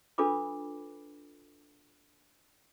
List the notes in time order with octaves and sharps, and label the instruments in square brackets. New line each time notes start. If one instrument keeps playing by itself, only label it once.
[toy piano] D4 F4 A4 B4 B5 D6